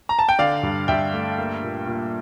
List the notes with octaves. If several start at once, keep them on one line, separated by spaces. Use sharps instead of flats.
A#5
A5
G5
D3 D5 F5
G2
G2 E5 G5
A3
A#3
A#2
A#2